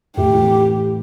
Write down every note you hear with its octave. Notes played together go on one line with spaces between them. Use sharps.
A2 G4
E3